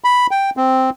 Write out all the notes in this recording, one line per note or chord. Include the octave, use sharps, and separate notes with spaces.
B5
G5
C4